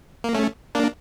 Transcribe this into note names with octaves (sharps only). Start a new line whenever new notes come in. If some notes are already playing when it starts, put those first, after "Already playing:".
A#3
A3 C#4
A#3 D4